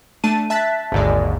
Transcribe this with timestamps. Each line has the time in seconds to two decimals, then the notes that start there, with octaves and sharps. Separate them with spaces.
0.24 A3 D4 A5 D#7
0.50 E5 A5 F#6 A6 B6
0.92 G#1 D#2 G#2 D3 D5